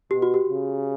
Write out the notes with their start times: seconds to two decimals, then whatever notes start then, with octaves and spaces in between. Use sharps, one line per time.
0.11 B2 G4
0.22 F#4
0.34 G4
0.48 C#3